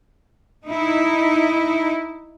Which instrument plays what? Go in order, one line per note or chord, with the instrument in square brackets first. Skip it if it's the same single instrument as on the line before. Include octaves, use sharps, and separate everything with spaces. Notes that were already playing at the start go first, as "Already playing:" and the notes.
[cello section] D#4 E4